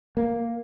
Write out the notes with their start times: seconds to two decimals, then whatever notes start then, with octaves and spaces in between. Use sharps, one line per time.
0.17 A#3